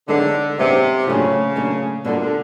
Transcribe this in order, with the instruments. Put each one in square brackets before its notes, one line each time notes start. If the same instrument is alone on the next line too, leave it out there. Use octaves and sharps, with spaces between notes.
[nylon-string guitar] F#2 D#3 G#3 B3 D4 [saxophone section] D3
[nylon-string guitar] F#2 D#3 G#3 B3 D4 [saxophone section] C3
[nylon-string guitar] A#2 F#3 A3 D4 F4 [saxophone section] C#3
[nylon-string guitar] A#2 F#3 A3 D4 F4
[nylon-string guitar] B2 G3 A#3 D4 F4 [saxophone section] D3
[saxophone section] D3